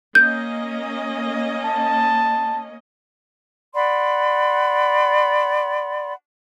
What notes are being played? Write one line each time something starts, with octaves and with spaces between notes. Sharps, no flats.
A#3 C#4 D#5 G6
A5
D5 F#5 B5 C6